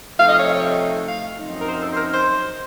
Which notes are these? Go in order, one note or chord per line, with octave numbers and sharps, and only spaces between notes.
C3 F3 A3 D#4 F5
D#5
C#5
F5
F#2 F3 C4 D#4
A#4
C5
A4
C5
A#4
C5